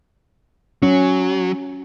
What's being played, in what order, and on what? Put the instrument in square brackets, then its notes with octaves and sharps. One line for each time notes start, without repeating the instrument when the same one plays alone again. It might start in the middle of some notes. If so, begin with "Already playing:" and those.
[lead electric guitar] F#3 [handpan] C#4